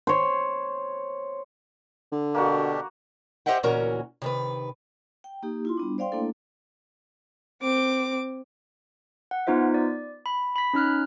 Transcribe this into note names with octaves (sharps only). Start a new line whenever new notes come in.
C5 C#5
D3
B2 A#3 D4 F#4 G4
G4 C5 D#5 E5 F#5 G5
D2 A#2 E3 C#4 F#4 A#4
C3 D#3 B4
G5
A#3 D#4 G4
E4 F4 C6
G3 B3 D4
C5 D5 F5 G5 C6
A3 A#3 D4 E4 A4
C4 D6
F#5
B3 D#4 F4 C5 E5
D5
B5
B5 B6
C#4 D#4 F6 F#6